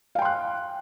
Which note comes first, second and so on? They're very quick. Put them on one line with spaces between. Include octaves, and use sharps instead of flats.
F5 G5 C6 F#6